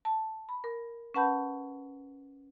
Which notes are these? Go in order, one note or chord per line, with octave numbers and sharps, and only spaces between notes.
A5
B5
A#4
C#4 B4 F#5 A5 B5 G6